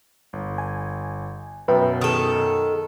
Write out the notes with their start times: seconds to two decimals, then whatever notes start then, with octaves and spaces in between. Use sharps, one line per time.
0.33 G1
0.58 G#5
1.68 F#2 B2 B4 E5 G5
2.01 D#3 A4 D#6